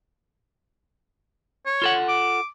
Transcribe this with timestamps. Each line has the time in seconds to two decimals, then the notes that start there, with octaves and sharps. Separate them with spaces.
1.66 C#5
1.82 F4 A4 F#5
2.09 D6